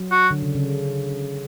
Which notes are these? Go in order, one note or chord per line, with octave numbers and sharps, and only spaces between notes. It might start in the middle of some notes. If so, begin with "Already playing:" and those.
Already playing: F#3
F#4
D3
C#3
C#3